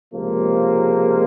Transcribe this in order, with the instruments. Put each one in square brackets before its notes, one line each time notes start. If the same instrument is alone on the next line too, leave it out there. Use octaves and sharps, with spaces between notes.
[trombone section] C#2 C3 F3 G#3 A#3